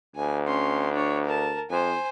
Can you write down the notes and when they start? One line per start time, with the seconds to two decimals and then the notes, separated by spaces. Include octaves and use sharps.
0.16 D2 G#5
0.47 C#4 C6
0.93 D4 C#5
1.25 A#4 A5
1.70 F2 C5 G#5